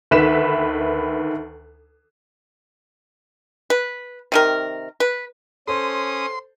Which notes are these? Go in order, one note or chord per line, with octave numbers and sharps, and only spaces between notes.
D2 D#3 B4 E5 B6 E7
B4
C3 D#3 A#4
B4
C#4 A4 C5 C6 D#6